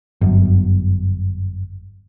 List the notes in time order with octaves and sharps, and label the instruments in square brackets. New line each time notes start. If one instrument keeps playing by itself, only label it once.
[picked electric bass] G1 F#2